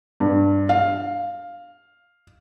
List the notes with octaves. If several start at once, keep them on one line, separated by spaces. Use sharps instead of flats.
G2
F5